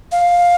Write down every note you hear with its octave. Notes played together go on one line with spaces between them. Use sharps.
F5